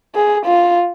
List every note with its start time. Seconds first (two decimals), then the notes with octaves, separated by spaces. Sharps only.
0.15 G#4
0.46 F4